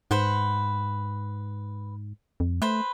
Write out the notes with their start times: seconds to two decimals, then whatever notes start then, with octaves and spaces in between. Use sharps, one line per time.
0.11 G#2 B4 C5 F#5
2.40 F2
2.62 A3 B4 C5